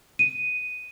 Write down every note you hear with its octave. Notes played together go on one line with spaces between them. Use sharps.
D#7